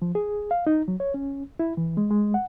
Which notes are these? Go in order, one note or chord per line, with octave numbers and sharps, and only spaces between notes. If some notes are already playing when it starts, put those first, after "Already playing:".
F3
G#4
F5
D#4
F#3
C#5
C#4
E4
E3
G#3
G#3
F#5